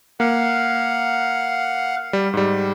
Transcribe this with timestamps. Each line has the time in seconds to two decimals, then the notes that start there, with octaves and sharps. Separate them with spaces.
0.20 A#3 F5 F#5
2.13 G3
2.34 G#2 G3